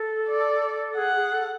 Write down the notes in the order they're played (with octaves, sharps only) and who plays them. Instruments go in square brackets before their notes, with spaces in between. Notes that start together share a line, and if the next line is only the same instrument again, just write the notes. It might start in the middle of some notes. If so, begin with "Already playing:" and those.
Already playing: [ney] A4
[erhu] D5
[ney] G#4 [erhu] F#5
[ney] G#4
A4